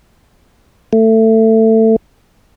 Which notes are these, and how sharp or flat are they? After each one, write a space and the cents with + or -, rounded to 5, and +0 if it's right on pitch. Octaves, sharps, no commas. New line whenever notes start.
A3 +20